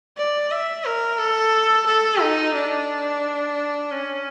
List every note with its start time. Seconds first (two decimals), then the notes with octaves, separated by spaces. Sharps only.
0.17 D5
0.51 E5
0.85 A#4
1.19 A4
1.86 A4
2.21 D#4
2.54 D4
3.91 C#4